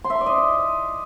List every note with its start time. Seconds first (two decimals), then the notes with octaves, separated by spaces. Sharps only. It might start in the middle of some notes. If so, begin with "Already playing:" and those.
0.04 C6
0.10 E5
0.15 C6
0.21 D5
0.26 D#5